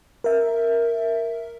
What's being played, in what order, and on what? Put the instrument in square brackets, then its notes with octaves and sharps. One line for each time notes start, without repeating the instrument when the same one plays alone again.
[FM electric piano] A#4 E5